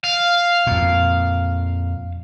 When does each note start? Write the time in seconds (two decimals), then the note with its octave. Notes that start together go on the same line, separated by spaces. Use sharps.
0.04 F5
0.67 F2 A#2